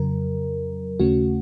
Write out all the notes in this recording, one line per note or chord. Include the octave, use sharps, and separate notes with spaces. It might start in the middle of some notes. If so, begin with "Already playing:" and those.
Already playing: F2 C#3 F#3 A#4
D#2 C#3 A3 C#4 F#4